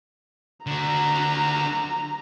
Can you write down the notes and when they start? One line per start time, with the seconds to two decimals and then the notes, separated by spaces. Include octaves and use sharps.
0.67 D3 F#4 A#5